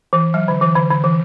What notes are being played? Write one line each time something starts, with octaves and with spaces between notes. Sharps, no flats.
E3
F#3
D3
E3
D3
D3
E3